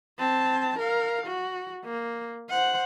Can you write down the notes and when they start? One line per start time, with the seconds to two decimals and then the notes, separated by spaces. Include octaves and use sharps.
0.19 C4 A5
0.78 A#4 F5
1.26 F#4
1.84 A#3
2.50 C5 F#5